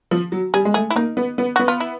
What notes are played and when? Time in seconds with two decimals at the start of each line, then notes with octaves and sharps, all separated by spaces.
0.11 F3
0.32 F#3
0.54 G3 G#4
0.65 G#3
0.74 A3 G#4
0.90 E4
0.96 A#3 D#4
1.17 B3
1.38 B3
1.56 B3 F#4
1.68 F4
1.80 E4